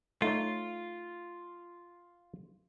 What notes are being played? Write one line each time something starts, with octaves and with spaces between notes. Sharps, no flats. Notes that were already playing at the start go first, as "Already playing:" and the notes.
A3 D#4 F4 C#5